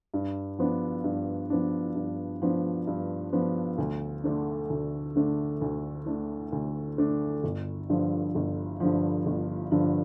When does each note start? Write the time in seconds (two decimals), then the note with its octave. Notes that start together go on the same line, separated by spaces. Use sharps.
0.14 G2
0.59 F3 B3 D4
1.04 G2
1.50 F3 B3 D4
1.96 G2
2.42 F3 B3 D4
2.87 G2
3.33 F3 B3 D4
3.78 D2
4.24 D3 A3 D4
4.70 D2
5.16 D3 A3 D4
5.61 D2
6.06 D3 A3 D4
6.52 D2
6.98 D3 A3 D4
7.44 G1
7.89 G2 D3 F3
8.35 G1
8.80 G2 D3 F3
9.26 G1
9.72 G2 D3 F3